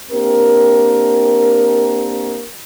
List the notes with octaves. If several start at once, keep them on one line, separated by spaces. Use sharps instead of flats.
A#3 C4 D4 G4 A#4